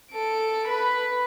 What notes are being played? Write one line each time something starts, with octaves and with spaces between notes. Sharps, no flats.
A4 D7
B4 B5